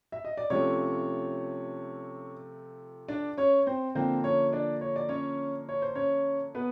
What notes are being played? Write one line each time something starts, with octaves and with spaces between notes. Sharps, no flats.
E5
D#5
D5
C3 F3 A3 C#4 C#5
D4 D5
C#4 C#5
C4 C5
D3 F3 A#3 C4 C5
C#4 C#5
D4 D5
C#5
D5
C#4 C#5
C#5
C5
C#4 C#5
B3 B4